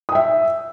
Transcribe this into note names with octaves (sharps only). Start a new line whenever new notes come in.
E5 G5 D#6